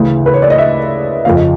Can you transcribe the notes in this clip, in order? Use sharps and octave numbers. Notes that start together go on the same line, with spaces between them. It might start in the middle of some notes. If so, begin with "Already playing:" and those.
Already playing: D2 C#3 E3
B4
C#5
D5
D#5
E5
F2 C#3 F3 F5
D#5